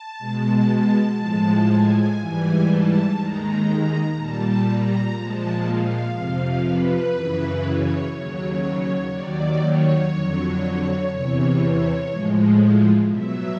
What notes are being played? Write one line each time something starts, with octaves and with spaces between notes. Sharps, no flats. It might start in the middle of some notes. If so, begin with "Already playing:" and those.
Already playing: A5
B2 G#3
A2 F3 G#3
G#5
G#2 E3 G3
A5
D#2 D#3 G#3 A#5
A#2 G3 A5
A#5
A#2 F3 G#3 A5
F5
F2 C3 F3
B4
F#2 C#3 E3
C#5
D#2 C#3 F#3 C#5
D#2 D#3 F#3 D5
C#5
F2 D3 F#3
E2 C3 E3 C#5
A2 F3 G#3
B2 F#3 E5